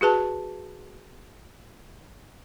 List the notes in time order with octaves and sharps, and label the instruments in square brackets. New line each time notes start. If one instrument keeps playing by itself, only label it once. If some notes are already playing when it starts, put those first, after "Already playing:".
[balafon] F#4 G#4 B4 A5